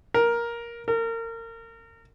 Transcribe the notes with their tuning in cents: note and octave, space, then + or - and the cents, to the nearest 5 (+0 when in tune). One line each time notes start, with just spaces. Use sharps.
A#4 +10
A#4 -30